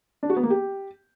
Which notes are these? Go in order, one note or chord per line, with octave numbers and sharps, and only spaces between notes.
D4
F#4
B3
A#3
G4